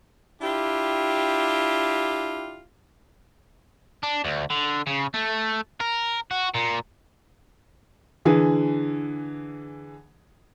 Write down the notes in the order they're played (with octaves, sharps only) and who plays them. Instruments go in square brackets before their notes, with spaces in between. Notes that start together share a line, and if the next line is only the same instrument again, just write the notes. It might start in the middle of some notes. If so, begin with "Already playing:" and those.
[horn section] D4 E4 F4 G4
[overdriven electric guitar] D4
D2
D3
C#3
A3
A#4
F#4
A#2
[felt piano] D3 E3 G#4